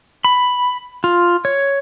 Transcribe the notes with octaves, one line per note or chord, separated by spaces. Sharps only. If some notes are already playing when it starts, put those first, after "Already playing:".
B5
F4
C#5